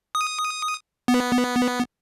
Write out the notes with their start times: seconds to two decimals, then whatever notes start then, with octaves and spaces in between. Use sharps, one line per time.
0.15 D#6
1.08 B3